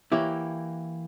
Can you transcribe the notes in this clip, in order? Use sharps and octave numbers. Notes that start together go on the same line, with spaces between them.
E3 A#3 E4 G4 C#5